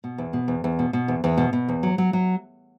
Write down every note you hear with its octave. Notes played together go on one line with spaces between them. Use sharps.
B2
E2
B2
E2
E2
B2
B2
E2
E2
B2
B2
E2
F#3
F#3
F#3